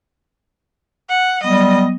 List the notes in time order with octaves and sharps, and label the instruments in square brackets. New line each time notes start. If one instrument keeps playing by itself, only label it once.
[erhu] F#5
[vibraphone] F#3 B3 G5 [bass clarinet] G3 [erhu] D#5